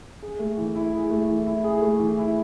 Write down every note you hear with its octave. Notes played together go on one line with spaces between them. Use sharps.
G#4
A3
E3
E4
G#4
A3
E3
E4
G#4
A3
E3
E4